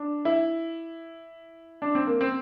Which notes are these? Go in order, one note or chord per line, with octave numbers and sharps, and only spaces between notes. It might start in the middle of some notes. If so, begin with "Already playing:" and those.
Already playing: D4
E4
D4
C4
A#3
C4